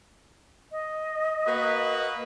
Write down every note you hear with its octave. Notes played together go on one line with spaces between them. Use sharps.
D#5
A#3 F#4 B4